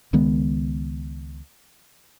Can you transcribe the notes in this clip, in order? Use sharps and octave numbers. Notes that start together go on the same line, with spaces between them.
C#2 D#3 G#3 B3